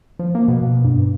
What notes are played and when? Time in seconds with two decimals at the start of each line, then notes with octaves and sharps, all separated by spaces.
0.19 F3
0.35 A#3
0.48 B2
0.85 G2